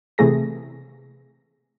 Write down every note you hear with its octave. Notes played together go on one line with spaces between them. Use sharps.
C3 E3 A3 G#4 A#6